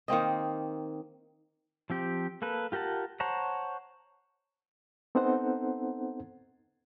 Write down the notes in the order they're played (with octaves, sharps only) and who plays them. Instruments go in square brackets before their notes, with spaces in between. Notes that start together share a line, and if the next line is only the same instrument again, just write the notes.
[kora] D#3 A#3 C4 D#5
[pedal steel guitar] F3 C4 G4
A#3 A4 B4
F4 G4 A#4 F#5 A5
C5 C#5 F#5 A5 A#5
[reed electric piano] B3 C4 D#4 A4 C5 F#5